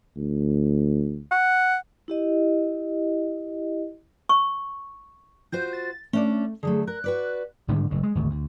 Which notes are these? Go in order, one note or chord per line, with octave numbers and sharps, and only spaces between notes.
D2
F#5
E4 G4 D#5
C#6
F4 F#4 C5 G6
A6
A3 C#4 D4 D5
D3 F#3 A3 G#4
A#4 F#6
F#4 B4 D5
G#2 D3 D#3 G3
F#1 A2
G#3
G#1 D2
D2